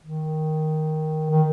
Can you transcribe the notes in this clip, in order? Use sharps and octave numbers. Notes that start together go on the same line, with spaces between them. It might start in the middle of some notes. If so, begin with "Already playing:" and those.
D#3
D#3